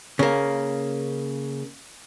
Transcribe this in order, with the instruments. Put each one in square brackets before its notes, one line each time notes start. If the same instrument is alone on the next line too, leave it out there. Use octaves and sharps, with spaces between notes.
[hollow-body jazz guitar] C#3 A#3